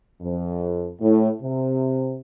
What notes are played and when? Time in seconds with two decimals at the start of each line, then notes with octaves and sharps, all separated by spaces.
0.21 F2
1.01 A2
1.42 C3